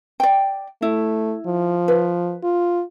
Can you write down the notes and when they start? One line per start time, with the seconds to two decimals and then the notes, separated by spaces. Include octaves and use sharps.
0.20 D5 G5
0.82 A3 E4
1.46 F3
1.88 B4
2.43 F4